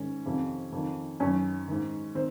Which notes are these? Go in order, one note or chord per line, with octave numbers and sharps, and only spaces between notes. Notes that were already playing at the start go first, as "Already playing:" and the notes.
Already playing: G#2 D#3 C#4
F2 C3 D#3
F2 D#3
F#2 D#3 C#4
G#2 D#3
D#3 C4